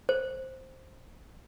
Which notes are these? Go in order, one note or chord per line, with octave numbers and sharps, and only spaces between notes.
C5